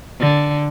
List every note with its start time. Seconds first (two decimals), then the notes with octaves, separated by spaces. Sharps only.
0.20 D3